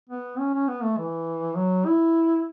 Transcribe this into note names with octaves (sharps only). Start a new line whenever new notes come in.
B3
C#4
C#4
B3
A3
E3
F#3
E4